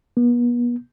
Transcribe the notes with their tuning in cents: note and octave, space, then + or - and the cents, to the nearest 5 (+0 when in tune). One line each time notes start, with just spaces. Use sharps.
B3 -40